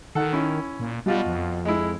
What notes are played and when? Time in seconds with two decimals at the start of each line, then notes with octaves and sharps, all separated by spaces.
0.15 D#3 A4 F#5
0.33 C#4 E4
0.80 A#2
1.06 B2 G3 F4 F#4
1.26 F2
1.65 G#3 E4